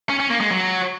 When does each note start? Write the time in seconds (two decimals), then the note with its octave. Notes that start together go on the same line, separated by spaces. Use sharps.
0.09 C#4
0.20 C#4
0.30 A#3
0.41 G#3
0.51 F#3